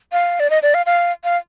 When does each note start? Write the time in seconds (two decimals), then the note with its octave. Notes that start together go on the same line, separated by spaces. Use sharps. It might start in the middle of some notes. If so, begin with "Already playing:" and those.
0.12 F5
0.40 D5
0.50 D#5
0.63 D5
0.74 F5
0.86 F5
1.24 F5